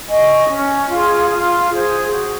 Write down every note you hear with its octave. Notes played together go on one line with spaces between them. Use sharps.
D#5 G#5 C#6
C#4
F4 G#4
F4
G#4 C5
F#4